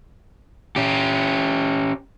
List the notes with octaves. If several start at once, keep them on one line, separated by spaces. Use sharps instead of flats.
C#4 G4